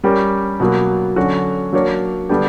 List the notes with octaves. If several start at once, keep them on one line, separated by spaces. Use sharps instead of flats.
G3 C#4 G4 A#4
B2 F#3 A#3
D3 F#3 C#4 F#4
F#3 A#3 D4 A#4 C#5
D3 G3 B3 D4 G4